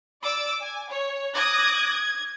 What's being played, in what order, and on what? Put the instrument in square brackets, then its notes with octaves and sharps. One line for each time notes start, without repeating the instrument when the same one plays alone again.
[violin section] D5 D6 E6
G#5
C#5
D6 D#6 F#6 G#6 A#6
G#6